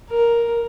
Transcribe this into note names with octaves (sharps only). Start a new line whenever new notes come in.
A#4